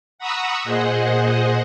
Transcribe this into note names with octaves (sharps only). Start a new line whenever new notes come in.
F#5 A#5 B5 C#6 D#6 E6
A#2 G#4 C5 D#5 F#5